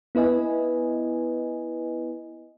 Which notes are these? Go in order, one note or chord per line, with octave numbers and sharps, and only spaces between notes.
B3 E4 B4 D#5 G#5